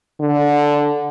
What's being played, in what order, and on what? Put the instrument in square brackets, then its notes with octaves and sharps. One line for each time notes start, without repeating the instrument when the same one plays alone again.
[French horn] D3